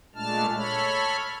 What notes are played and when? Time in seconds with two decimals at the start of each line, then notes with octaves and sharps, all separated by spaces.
0.15 A#2 G#3 A3 D4 A5 F6
0.56 A4 C#5 B5 F6